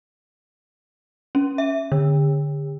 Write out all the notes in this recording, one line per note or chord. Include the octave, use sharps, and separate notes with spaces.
C#4
E5
D3